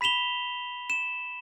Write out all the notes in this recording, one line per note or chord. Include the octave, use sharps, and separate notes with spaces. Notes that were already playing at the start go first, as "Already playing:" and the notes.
B5 B6 E7 F7 G7
E7